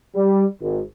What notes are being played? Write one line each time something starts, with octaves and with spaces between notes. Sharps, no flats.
G3
G#1